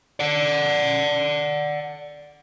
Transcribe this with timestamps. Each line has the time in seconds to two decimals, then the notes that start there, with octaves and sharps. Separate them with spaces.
0.20 D5 F#5